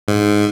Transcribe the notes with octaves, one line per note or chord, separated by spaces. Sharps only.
G#2